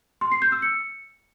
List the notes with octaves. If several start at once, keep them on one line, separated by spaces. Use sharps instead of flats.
C6
C7
G6
E6
C#7